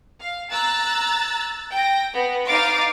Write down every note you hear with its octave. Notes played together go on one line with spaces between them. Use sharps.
F5
A#5 E6 F#6 A6
G5 A#6
B3
D#4 F5 D6 A6